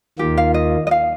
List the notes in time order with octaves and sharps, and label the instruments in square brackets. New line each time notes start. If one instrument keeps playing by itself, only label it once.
[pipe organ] D#2 D#3 A#3 F4 [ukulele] G4
[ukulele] F5
D#5
D#5
F5